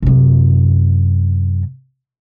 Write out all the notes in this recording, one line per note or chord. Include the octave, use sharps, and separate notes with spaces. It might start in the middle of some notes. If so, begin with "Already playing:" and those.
F#2 C3